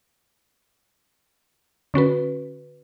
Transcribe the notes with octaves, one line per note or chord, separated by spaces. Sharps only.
D3 C#4 F#4 B4